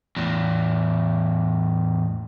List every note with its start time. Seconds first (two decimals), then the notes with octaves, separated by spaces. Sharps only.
0.17 E2 A2